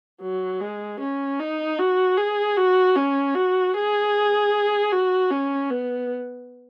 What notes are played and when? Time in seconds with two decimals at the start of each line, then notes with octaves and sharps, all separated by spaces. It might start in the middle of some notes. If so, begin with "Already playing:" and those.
0.22 F#3
0.61 G#3
1.00 C#4
1.40 D#4
1.79 F#4
2.17 G#4
2.57 F#4
2.96 C#4
3.35 F#4
3.73 G#4
4.92 F#4
5.30 C#4
5.70 B3